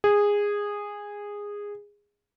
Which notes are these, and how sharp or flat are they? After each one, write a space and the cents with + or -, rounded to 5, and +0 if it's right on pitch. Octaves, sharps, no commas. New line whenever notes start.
G#4 -15